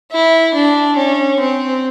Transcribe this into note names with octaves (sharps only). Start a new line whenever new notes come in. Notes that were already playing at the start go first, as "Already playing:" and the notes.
E4
D4
C#4
C4